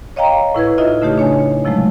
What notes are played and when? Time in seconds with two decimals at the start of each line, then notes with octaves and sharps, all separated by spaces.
0.16 C#5 D#5 F5 G5 A#5
0.54 A2 E4 B4 G#6
0.78 D#4 F4 D#5 E5
1.02 C#3 A3 D#4 G4 C#5
1.18 D4 C#5 G#5
1.65 C3 F3 F#3 G#3 A3